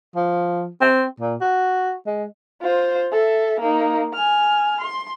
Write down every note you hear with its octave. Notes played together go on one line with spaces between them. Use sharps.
F3
C4
A#2
F#4
G#3
F4 C5
A4 E5
A#3 D#4
G#5 F6
C6